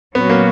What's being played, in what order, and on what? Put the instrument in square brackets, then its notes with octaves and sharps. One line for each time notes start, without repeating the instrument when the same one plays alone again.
[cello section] A#2 F#3 C#4 F#4 [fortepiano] B3
[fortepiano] A#3